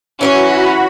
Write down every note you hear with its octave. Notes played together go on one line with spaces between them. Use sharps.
E3 F#3 C#4 E4 F#4 B5